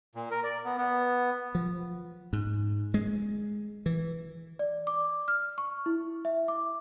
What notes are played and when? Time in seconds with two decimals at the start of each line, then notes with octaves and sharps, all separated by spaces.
0.15 A#2
0.31 A#4
0.44 D5
0.65 B3
0.78 B3
1.55 F3
2.33 G#2
2.94 G#3
3.86 E3
4.59 D5
4.87 D6
5.28 F6
5.58 C#6
5.86 E4
6.25 E5
6.48 D6